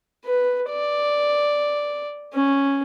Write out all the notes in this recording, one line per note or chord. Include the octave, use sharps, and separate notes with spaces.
B4
D5
C#4